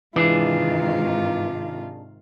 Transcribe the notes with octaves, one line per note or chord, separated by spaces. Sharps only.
G#2 C3 D#3 E3 D4 F4 G#4